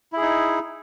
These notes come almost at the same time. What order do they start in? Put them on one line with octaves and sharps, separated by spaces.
E4 G#4 D#4